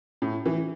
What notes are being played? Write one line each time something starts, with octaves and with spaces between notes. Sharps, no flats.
A2
E3